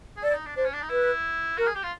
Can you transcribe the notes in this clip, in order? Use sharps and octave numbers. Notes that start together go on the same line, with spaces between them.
G#4
A4 D5
E4
D#4
D4
D4 C5
C#4
D4
D#4
E4 B4
F#4 A#4
G#4
G4
F4